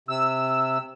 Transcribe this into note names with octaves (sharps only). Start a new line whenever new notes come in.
C3 E6